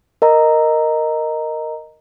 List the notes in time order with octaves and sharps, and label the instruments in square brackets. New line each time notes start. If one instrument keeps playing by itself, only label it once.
[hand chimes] A#4 D#5 A#5